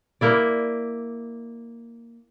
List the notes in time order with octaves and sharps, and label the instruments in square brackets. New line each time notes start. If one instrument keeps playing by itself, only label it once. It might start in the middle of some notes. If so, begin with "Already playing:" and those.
[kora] A#3 E4 D5